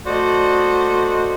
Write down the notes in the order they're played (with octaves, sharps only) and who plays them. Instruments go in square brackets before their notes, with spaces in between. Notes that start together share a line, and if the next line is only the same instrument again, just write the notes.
[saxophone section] A3 F#4 C5 D5 D#5